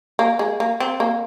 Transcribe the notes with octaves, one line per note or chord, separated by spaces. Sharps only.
A#3
G#3
A#3
C4
A#3